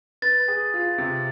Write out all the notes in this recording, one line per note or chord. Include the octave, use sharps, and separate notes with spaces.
B4 A6
G#4
F4
C3